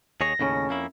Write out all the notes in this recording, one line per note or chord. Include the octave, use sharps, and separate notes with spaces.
D#2 G#4 C#5 A#6
D#2 A2 C#3 C#4
F2 A#3 E4